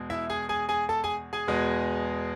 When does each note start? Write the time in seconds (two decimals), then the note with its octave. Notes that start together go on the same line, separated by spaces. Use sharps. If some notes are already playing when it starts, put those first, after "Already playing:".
Already playing: E2 B2 G#3
0.10 E4 E5
0.30 G#4 G#5
0.49 G#4 G#5
0.69 G#4 G#5
0.89 A4 A5
1.04 G#4 G#5
1.33 G#4 G#5
1.47 E2 B2 G#3 B3